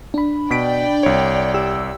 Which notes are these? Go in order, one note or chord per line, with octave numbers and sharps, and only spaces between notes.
D4 B5
B2 D5 G5 B6 D7
C2 C#5
G4 E6